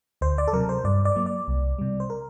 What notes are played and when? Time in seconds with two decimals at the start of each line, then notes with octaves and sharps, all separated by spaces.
0.21 D2 C5
0.38 D5
0.48 A4
0.53 C3 F#3 A#4
0.69 C5
0.84 G2 D5
1.05 D5
1.16 F#3 A#3
1.26 D5
1.48 C2
1.78 C3 G3
2.00 C5
2.10 A#4